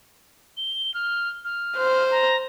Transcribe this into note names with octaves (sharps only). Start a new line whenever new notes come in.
G7
F6
F6
C5
A#5